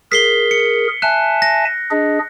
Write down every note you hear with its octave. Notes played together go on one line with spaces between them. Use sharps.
G#4 A#4 B6 C7 G7
C#7
E5 G#5 A5 F#6
A#6
D4 G#4 D#5